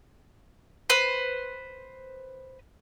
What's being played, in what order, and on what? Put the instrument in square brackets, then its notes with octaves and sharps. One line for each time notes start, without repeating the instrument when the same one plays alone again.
[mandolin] B4 C5